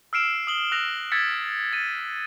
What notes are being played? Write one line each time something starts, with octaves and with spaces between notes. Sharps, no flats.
E6 F6 C7 D7 E7
D#6 F#7 G7
E6 F#6 A#6 F7
E6 G#6 A6 B6 C#7
A6 D#7